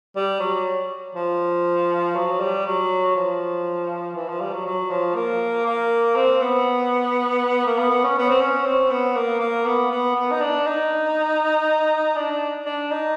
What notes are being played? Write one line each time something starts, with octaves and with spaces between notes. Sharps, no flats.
G3
F#3
F3
F#3
G3
F#3
F3
E3
F3
G3
F#3
F#3
F3
A#3
A#3
C4
B3
A#3
B3
B3
C#4
B3
C4
C#4
C4
B3
A#3
A#3
B3
B3
B3
D#4
D4
D#4
D4
D4
D#4